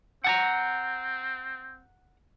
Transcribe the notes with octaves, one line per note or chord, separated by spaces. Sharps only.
C4 F#5 A5 A#5